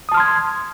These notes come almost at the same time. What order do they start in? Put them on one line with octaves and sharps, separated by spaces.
D#6 A5 F6 C6 G#6